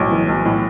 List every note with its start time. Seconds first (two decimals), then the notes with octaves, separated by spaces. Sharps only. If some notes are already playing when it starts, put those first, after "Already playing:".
Already playing: B1 A2
0.11 E3
0.28 B1
0.45 A2